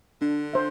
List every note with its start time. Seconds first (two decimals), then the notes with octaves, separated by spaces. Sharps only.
0.21 D3 D4
0.53 C5 E5